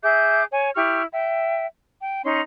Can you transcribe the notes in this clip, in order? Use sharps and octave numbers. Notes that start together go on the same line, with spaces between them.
G#4 E5 D6 G6
C#5 G#5
E4 G4 C#6 F6
E5 G5
G5
C#4 D#4 C6